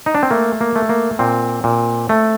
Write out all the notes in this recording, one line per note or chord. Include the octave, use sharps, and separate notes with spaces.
D#4
D4
C4
A3 A#3
A#3
A3
A#3
A#2 C4
A#2
A3